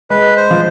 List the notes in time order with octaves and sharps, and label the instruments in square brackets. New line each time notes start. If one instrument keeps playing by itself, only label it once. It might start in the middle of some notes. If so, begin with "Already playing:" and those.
[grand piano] G#3 [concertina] B4
[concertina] C5
[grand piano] F3